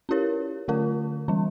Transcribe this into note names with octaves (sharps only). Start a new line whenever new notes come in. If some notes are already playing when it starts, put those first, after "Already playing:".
C#4 E4 G4 A#4 C#5
D3 A3 C#4 F4 A#4
E3 G3 C#4